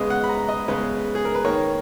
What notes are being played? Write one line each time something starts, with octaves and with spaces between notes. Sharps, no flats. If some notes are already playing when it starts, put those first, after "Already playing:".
Already playing: C#3 G#3 B3 D#5
F#5
B5
A#5
D#5
C#3 G#3 B3 B4
G#4
A#4
B4
D#3 A#3 C#5